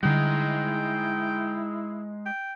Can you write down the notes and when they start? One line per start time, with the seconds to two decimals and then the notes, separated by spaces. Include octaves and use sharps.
0.03 D3 G3 G#3 D#4 E4 G5
2.25 G5